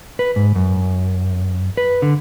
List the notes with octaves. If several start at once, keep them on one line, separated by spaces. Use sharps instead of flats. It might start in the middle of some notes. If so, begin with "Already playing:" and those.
B4
G#2
F#2
B4
D3